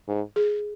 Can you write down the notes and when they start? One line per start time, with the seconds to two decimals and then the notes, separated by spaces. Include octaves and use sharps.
0.08 G#2
0.36 G#4